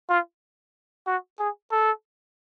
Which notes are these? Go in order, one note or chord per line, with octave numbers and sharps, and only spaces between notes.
F4
F#4
G#4
A4